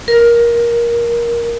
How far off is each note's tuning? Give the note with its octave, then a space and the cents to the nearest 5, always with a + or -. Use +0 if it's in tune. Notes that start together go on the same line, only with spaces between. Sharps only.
A#4 +15